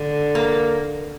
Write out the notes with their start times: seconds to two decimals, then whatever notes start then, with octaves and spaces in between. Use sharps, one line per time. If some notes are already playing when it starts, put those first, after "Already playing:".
Already playing: D3
0.35 A#3